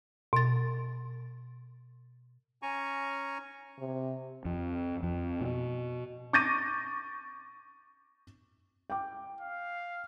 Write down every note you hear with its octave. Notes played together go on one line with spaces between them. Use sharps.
B2 A6
C#4 G#5 A#5 C#6
C3
F2
F2
B2
C#6 D6 G6 A6 A#6 D#7
G5 D6
F5